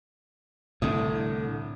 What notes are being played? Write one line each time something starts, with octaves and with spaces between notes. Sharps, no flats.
C2 A2 D3 D#6